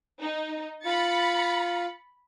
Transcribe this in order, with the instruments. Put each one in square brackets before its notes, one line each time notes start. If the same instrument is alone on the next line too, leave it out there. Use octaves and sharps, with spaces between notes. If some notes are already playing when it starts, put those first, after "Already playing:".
[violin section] D#4
[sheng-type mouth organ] F4 [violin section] B5 A6 C#7